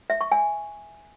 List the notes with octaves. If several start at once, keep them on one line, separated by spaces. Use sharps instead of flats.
E5
C#6
G#5